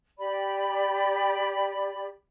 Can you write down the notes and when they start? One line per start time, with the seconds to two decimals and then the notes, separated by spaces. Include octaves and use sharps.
0.18 G4 D5 B5